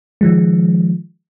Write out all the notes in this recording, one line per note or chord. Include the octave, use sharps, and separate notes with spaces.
D#3 F3 G#3